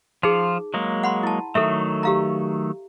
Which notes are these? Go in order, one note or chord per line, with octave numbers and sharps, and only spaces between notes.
F3 D#4 F4 G#4
F#3 G#3 A#3
F#5 B5 C6
E4 A5
D#3 F#3 A3 A4 E5
G4 F5 A#5